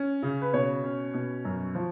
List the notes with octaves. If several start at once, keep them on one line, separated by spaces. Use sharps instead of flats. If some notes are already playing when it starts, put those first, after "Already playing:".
Already playing: C#4
C#3
B4
B2 C#5
C#4
B2
F#2
F3